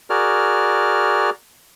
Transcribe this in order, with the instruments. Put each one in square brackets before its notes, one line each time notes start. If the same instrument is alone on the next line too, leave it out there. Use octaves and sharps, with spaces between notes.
[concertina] F#4 G#4 A#4 D5 F6